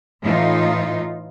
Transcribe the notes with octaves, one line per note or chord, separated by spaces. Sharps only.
A2 E3 D#4 F4